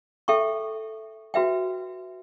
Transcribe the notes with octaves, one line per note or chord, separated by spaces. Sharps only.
A4 E5 G5 C#6
F#4 B4 E5 G5